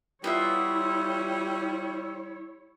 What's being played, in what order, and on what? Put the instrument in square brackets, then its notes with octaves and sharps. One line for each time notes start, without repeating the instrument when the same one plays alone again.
[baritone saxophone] G3 [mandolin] B3 F4 E5 [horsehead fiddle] E4 C#5